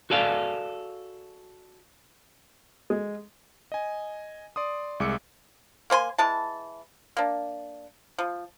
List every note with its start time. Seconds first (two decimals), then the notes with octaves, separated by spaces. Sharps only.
0.10 F#4 G#4 A4 D5 F5
2.90 G#3
3.72 D#5 G#5
4.56 D5 C6 D#6
5.00 C2 G#3 D6 E6 C#7
5.90 A#3 C5 G#5 C6
6.18 E3 G#3 A5
7.17 A#3 D4
8.18 F3